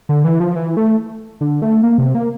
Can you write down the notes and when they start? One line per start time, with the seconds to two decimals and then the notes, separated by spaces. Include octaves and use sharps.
0.09 D3
0.24 E3
0.40 F3
0.56 E3
0.77 A3
1.41 D3
1.62 A3
1.83 A#3
1.98 C3
2.15 A#3